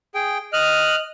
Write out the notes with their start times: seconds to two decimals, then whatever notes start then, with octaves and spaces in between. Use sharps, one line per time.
0.15 G#4 G5
0.53 D#5 F6 F#6